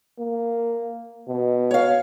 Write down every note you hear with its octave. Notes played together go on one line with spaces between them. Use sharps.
A#3
B2
C#5 F5